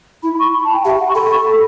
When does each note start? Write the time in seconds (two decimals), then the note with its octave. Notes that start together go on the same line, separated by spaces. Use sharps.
0.23 E4 B5
0.39 C#6
0.54 B5
0.64 A5
0.74 G5
0.85 G4 E5
1.00 F#5
1.08 C#6
1.15 A4 B5
1.30 C#6
1.46 B5